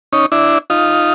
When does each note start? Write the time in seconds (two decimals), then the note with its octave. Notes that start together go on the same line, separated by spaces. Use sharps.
0.13 C#4 D#4
0.32 D4 E4
0.70 D#4 F4